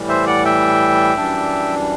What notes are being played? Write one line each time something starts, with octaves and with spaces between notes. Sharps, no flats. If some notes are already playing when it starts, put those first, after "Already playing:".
Already playing: A2 E3 G3
C5 E5
D5 F#5
E5 G5
F#2 E3 G3 D4